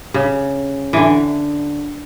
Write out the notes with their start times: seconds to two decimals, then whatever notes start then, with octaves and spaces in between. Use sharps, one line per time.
0.14 C#3
0.93 D3 E3